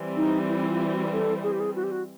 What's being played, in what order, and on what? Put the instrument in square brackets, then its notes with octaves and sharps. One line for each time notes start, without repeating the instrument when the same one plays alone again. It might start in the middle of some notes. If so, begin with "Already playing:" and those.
Already playing: [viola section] E3 G3 C4
[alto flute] D#4
E4
E4
F4
F#4
A4
G#4
G4
G#4
F#4
G4
F#4